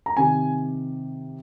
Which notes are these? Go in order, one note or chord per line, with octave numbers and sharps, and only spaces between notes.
A#5
C3 D#3 G#5